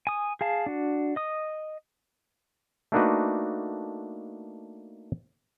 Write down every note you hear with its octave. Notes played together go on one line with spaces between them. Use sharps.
G#5 D#6
G#4 F5 A5
D4 F#4
D#5 D#6
A3 A#3 D4 D#4 F#4 B4